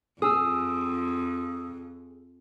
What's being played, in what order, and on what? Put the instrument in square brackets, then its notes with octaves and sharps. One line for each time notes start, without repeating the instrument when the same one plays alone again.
[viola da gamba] F2 [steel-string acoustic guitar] G#4 [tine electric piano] D#6 E6